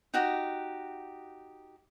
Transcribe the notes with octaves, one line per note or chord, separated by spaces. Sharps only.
D#4 F#4 G4